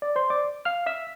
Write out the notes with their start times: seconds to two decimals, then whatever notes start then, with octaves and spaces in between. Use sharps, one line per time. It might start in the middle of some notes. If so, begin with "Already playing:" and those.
0.02 D5
0.16 C5 C6
0.30 D5 D6
0.65 F5 F6
0.86 E5 E6